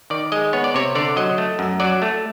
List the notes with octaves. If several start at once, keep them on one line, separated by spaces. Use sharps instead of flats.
D#3 D5
G#3 D#5
B3 C#5
D5
C3 C#5
D3 D5
F#3 D#5
A3
F#2
F#3 D5
A3